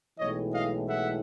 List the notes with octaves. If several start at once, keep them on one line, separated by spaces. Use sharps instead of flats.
B1 A2 E3 G#3 C#5 D#5
D#5 F5
E5 F#5